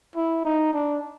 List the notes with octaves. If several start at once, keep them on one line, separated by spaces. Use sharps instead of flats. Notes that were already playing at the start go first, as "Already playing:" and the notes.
E4
D#4
D4